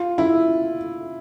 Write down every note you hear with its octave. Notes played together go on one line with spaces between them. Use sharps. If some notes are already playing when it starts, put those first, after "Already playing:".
Already playing: F4
E4